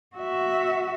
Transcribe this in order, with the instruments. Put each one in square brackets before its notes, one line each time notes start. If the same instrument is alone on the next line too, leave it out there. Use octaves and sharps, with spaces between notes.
[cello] F#4 E5